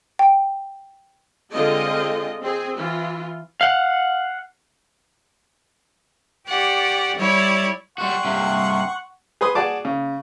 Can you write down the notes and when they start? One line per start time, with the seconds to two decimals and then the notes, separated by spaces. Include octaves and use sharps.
0.19 G5
1.53 D3 G#3 C4 F4 G#4 D#5
2.41 C4 G#4
2.77 E3 F4
3.61 F5 F#5
6.47 G4 D5 F#5 C#6
7.16 G3 E4 C#5 D5
7.98 G3 F#4 F#5 C6 C#6
8.25 G2 C3
9.41 G#4 B4 C6 D#6
9.55 F#4 G#4 D5 A5 D6
9.85 C#3